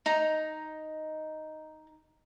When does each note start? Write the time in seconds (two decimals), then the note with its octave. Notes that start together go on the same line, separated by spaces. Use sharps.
0.06 D#4 A#5